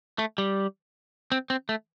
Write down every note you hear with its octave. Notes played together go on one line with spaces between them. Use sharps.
A3
G3
C4
C4
A3